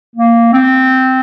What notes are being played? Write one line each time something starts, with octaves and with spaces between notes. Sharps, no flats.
A#3
C4